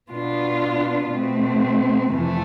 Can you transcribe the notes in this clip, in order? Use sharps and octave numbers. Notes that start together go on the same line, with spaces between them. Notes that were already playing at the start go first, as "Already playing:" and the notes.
B2 B3 D4 F4
B2 A3 C4
F2 C3 E3 A3